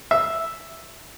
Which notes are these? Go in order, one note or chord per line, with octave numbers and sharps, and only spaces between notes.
E5